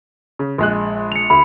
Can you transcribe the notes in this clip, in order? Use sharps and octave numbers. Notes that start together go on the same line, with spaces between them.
C#3
A#1 G#3 F#6
C#7 F7
D2 B5